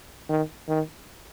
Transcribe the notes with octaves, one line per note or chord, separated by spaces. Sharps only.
D#3
D#3